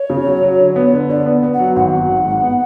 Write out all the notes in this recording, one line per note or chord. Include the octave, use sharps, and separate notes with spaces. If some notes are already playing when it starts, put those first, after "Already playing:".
Already playing: C#5
C#3
F#3
F#3
D3
B3
D3
D3 D5
B3
B3
F#5
F#3
G#1 F#5
F#3
G#1
G#2
B3